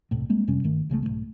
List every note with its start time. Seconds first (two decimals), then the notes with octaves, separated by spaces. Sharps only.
0.11 D#1 C2 A2
0.29 G3 G#3 A#3 C4
0.48 F2 C3 G3 C#4
0.63 G1 G2 D#3 A3
0.90 C2 C#3 F3 A3
1.03 B1 E2 G#2 A3